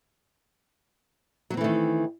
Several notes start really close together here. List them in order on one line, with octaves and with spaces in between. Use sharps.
F#3 C4 E3 A3 D#3